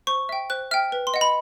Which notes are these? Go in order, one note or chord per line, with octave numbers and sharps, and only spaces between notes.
C5 C#6
E5 G5
C5 F#6
E5 G5 F6
B4
C6
D#5 F#5
B5